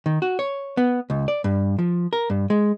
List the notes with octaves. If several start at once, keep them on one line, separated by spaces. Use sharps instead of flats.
D#3
F#4
C#5
B3
C#2
D5
G2
F3
A#4
G2
G#3